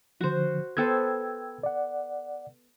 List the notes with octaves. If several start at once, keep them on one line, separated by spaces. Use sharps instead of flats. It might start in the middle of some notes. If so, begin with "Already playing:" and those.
D3 F3 F#4 C5
B3 A4 C5 G5 E6 G#6
D5 F#5